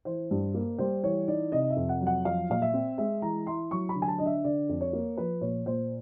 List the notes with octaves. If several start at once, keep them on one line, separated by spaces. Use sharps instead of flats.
E3 C5
G2
A#3
G3 C5
E3 C#5
D#4 D5
C3 D#5
E5
F2
F#5
F#3
F#5
F3 F5
A#2 F5
E5
C4
G#3 E5
E3 A#5
E4 C6
F#3 C#6
B5
D3
G#5
A5
D4 D#5
E5
D3 D5
F2
C#5
A#3
F3 B4
A#2 C#5
A#2 C5